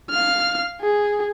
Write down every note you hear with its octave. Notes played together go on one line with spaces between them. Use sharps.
F5 F6
G#4